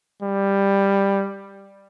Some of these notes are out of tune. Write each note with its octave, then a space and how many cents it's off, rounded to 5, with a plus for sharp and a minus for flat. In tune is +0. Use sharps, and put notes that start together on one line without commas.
G3 +10